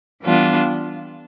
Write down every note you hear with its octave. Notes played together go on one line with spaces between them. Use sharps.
E3 G3 B3 D4 F4